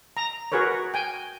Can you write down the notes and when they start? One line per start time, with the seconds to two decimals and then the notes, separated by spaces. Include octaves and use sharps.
0.17 A#5
0.52 F#4 G#4 A#4 B4 C#5
0.94 G5 G#5